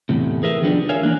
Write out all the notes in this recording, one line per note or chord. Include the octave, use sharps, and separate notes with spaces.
E2 A2 C3
G#4 A#4 B4 E5
D#3 F3 G3 B3 C#4 D4
A#4 C#5 E5 F5 G#5
E3 A#3 D4